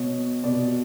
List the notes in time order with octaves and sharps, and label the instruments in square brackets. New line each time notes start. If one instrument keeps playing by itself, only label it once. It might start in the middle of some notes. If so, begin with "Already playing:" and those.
Already playing: [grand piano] B2 C#5
B2 D5